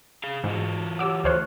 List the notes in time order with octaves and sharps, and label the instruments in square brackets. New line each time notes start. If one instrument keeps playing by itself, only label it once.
[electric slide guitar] G#4 F5
[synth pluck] G#2 [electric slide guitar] E3 F4 F#4
[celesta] G4 C#5 F#5 [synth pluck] D6 E6
[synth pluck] D2 C5 C#5 [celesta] F6 F#6